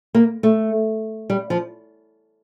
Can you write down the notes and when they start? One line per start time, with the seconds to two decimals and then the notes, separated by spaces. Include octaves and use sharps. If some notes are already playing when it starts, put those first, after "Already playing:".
0.15 A#3
0.43 A3
1.30 G3
1.50 F3